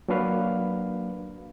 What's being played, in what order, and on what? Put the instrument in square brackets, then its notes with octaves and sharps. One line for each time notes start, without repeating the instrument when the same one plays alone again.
[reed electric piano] F#3 A#3 D4 F#4 B4 F5